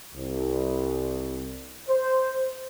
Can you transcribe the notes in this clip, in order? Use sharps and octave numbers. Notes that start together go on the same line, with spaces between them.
C2
C5